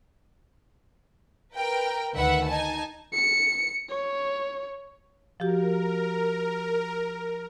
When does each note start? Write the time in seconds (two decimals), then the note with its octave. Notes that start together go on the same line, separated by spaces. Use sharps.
1.54 A#4 B4 G5
2.14 D2 D#3 B4 E5 F#5
2.48 D#4 G#5 A5
3.13 C#7
3.90 C#5
5.40 F3 F#4 G4 A#4